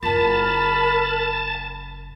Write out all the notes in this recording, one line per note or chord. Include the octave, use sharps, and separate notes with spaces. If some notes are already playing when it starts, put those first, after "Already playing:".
F#1 F4 A#4 A5 B5